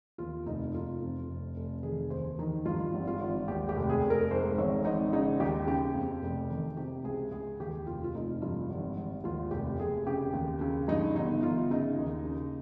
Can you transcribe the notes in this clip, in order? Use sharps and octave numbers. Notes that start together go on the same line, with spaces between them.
D#2 F4
F1 D#4
F1 F4
F2
F1
F1
D#3 G#4
D#2 C5
D#3 D#4
G2 F4
G#1
F4
G#1
D#2 G4
G4
F1
G#4
F1
A#4
G#2 C5
G#1 C#5
G#1 D#4
C#3 D#4
D#2 G4
C#3 G4
F2
F1
D#3
C3 G4
C#2 G#4
C#2 G#4
D#2 G4
F1 F4
F4
F1 D#4
G2 F4
G#1
G#1
D#2 F4
F1 G4
F1 G#4
C#3 G4
D#2
C#3
G2 D#4
G1 D#4
G1 F4
C#3 D#4
D#2
C#3